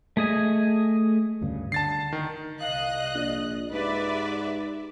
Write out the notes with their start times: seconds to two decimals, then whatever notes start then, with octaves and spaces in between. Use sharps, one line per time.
0.17 A3 G#4 D#5 G#5
1.41 D2 G2 C#3
1.72 D3 A5 A6 C7
2.12 D#3
2.60 C2 D#5 F5 F#6
3.14 A#1 D5
3.72 G#2 G4 B4 D5 E5